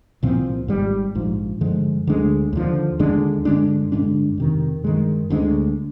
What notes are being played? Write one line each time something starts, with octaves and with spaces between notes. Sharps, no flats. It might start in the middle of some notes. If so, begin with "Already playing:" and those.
C2 A#2 F3 C4
G#1 G#2 G3
A#1 G#2 F3
G2 D3 F3 G#3
D2 D3 G#3 D4
D#2 D3 F3
D#2 D3 G#3 D4
G2 D3 G#3 D4
G2 D3 G#3 D4
F2 C3 D#3
G2 D#3 G#3
D2 D3 G#3 D4